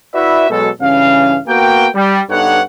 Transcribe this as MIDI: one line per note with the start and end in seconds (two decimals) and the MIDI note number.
0.14 0.48 64
0.14 0.48 66
0.14 0.48 71
0.14 0.48 74
0.14 0.48 76
0.50 0.69 47
0.50 0.69 54
0.50 0.69 56
0.50 0.69 69
0.81 1.39 43
0.81 1.39 49
0.81 1.39 52
0.81 1.39 61
0.81 1.39 77
1.48 1.88 58
1.48 1.88 59
1.48 1.88 66
1.48 1.88 70
1.48 1.88 79
1.95 2.22 55
2.30 2.61 43
2.30 2.61 59
2.30 2.61 63
2.30 2.61 69
2.30 2.61 73
2.30 2.61 78